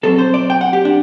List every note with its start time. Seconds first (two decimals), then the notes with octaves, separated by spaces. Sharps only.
0.03 B2 F#3 C4 A4
0.18 C5
0.34 D5
0.50 G5
0.61 F#5
0.73 G4
0.85 D4